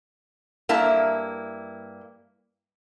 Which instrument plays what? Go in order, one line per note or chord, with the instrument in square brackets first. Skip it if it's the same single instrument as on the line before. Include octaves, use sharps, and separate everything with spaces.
[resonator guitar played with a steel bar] G2 A#3 E4 A5